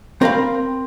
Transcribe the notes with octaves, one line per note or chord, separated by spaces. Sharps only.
C4 A#4 F5 B5